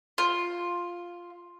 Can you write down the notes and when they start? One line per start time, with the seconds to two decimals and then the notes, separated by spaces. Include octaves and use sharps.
0.18 F4